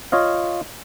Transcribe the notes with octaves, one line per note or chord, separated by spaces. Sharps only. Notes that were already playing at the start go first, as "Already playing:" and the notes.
F4 C#5 D#5 F5